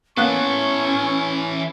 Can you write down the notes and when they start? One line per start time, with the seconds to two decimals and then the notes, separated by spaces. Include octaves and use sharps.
0.17 E3 A#3 B3 C#4 A4 C#6 F#6